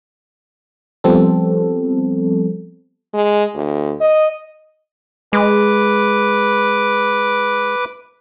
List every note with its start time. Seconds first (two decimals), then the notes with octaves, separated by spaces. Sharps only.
1.04 F3 G3 B3 C4 A4
3.14 G#3
3.55 D2
4.00 D#5
5.33 G#3 B4 D6